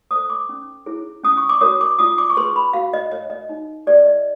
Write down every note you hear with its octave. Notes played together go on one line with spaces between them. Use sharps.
A4 C5 D#6
D6
C#4
E4 G#4 C#5
C#4 D#6
C#6
D6
F#4 A#4 C#5 D#6
D6
F4 D#6
D6
C#6
G#4 B4 C6
B5
F#4 F5
D#5
A#4 C#5 D#5
D#5
D#4
G4 B4 D5
D#5